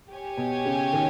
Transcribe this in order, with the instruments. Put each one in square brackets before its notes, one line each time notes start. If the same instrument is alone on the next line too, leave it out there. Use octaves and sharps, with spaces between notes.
[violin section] G4 C#5 G#5
[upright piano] B2
C#3
D#3